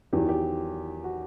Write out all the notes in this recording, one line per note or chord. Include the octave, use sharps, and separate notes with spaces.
E2 D#3 F#3 G4
G4
F#4